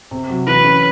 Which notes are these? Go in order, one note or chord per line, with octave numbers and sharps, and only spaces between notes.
C3
F#3
E3 B4
C#4